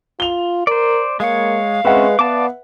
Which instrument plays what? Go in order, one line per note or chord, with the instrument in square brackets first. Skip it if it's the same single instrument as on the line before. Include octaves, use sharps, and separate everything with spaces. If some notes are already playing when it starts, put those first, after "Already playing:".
[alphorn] F4 [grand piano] F7 G7
[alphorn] A#4 [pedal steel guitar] C5 D5
[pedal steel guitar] G#3 C#5 [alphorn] A#3 [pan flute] F5
[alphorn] G#3 [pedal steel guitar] C4 C#4 [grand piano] B4 E5 F#5
[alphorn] B3 [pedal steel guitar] D5 A5 D6